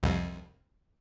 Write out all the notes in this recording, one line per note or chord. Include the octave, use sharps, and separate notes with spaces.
C2 F2